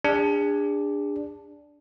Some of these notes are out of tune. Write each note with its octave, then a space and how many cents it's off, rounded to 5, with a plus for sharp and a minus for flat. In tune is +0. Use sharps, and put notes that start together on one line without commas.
D4 -5 G#4 -35